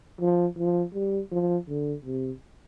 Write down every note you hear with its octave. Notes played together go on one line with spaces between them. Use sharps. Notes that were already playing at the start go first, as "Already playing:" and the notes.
F3
F3
G3
F3
D3
C3